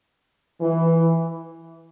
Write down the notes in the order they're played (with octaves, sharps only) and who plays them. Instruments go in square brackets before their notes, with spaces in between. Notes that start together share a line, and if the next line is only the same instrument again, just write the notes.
[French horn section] E3